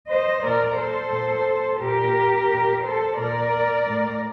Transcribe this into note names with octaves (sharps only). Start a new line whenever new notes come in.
C5 D#5
A#2 A#4 D5
A4 C5
A#2
A#2 G4 A#4
A#2
A4 C5
A#2 A#4 D5
A2